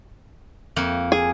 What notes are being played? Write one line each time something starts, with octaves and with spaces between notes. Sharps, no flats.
F2 A#3
G#4